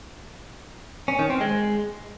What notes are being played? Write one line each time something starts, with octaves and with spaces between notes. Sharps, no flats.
C#4
D#3
C4
G#3